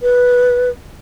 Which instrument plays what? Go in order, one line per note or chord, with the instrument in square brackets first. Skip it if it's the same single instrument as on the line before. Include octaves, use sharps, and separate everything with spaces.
[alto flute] B4